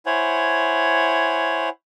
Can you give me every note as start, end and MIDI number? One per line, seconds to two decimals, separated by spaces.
0.06 1.69 64
0.06 1.69 72
0.06 1.69 73
0.06 1.69 78
0.06 1.69 80